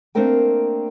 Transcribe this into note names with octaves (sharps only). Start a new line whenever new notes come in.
A3 A#3 C4 D4 A#4 G5